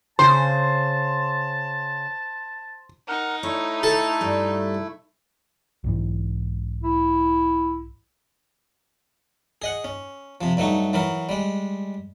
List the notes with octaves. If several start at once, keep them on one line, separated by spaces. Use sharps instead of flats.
C#3 C5 A5 C6
D#4 A#4 F#5
A3 E4 C#5
A4
G2 G3
B1 G#2 E3
E4
G#4 D#5 F#5
C#4
C3 F3
G2 F#3 A3 D#4
E3 F#3 A#4
G3 G#3